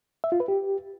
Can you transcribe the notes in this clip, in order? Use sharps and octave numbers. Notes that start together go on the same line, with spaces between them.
E5
F4
B4
G4